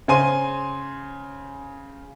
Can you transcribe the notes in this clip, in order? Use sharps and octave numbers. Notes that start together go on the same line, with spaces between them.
C#3 C5 G#5 C6 D#7